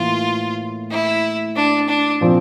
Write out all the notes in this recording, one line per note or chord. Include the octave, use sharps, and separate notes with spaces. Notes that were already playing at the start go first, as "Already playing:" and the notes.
Already playing: A2 E3 A#3 F4
E4
D4
D4
A#2 F3 C4